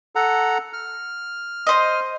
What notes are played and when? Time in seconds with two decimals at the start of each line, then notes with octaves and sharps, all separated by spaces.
0.16 A4 F#5 A#5
0.73 F6
1.67 C5 D#5